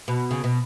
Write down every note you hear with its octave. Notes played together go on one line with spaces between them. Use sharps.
B2
C#3
B2